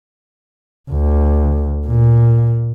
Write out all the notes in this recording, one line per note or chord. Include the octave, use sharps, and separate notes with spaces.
D2
A#2